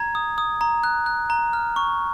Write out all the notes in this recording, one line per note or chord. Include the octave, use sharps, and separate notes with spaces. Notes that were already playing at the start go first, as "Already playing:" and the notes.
Already playing: A#5 G#6
D#6
D#6
A#5
F#6
F#6
A#5
F6
C#6